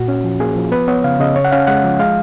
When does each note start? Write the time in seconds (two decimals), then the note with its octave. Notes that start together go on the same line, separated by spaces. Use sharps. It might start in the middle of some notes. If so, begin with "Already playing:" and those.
Already playing: A#2 F#4
0.08 C#4
0.24 F3
0.40 A#3 G#4
0.56 F3
0.72 B3 B4
0.88 B3 C#5
1.04 C#3 F5
1.20 C#3 D#5
1.36 C#4 C#5
1.45 F#5
1.51 C#4 F5
1.67 G#3 F#5
1.84 F3
1.99 G#3 F5